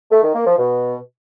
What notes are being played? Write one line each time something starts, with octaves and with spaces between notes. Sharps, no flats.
A3
D#3
A#3
F3
B2